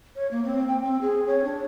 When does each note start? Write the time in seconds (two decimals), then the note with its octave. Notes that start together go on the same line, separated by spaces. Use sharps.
0.16 C#5
0.31 A#3
0.44 C4
0.68 G5
0.83 C4
1.02 G#4
1.27 C#5
1.44 D4